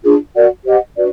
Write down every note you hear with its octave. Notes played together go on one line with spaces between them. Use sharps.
D4 F4 G#4
F#4 A#4 D5 F#5
G4 C5 D#5 F#5
D4 F#4 B4 D5